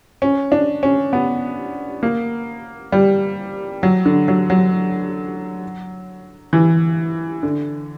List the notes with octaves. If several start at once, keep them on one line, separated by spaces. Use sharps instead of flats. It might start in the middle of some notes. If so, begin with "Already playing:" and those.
C#4
D4
C#4
B3
A#3
G3
F#3
D3
F#3
F#3
E3
D3